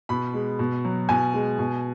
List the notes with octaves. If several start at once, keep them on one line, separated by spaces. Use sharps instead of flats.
B2 B5
G#3
B2
F#3
B2 G#5
G#3
B2